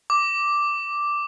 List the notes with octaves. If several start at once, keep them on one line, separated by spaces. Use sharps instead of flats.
D6